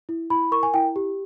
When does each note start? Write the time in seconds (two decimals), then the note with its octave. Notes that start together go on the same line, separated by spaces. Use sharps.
0.09 E4
0.30 E4 B5
0.52 A#4 C#6
0.63 G#5
0.74 E4 G5
0.96 G4